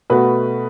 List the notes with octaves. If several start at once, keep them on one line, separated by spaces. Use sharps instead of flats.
B2 A3 F#4 B4